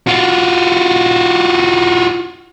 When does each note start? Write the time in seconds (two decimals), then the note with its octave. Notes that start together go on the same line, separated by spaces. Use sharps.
0.07 F4 F#4